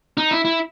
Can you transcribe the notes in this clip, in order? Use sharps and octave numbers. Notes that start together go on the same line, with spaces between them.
D#4
E4
E4